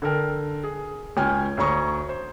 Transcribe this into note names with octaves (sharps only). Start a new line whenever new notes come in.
D3 A4 A#4 G5
G#4
C#2 C#4 G5 G#5 F6 G#6
D2 D3 C#5 A#5 C#6 D#6
C5